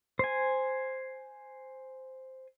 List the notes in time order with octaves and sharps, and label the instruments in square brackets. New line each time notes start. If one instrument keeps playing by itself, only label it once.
[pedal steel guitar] C5 G#5